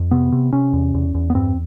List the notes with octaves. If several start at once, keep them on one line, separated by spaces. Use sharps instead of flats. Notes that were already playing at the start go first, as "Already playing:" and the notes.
Already playing: F2
C3 B3
C3
C3 C#4
E2
E2
E2
B3
G2 C4